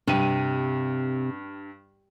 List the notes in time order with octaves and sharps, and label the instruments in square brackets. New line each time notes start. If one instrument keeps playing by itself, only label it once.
[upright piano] G2 D#7 [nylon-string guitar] C3